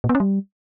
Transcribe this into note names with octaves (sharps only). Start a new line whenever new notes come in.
A#2
B3
C#4
G3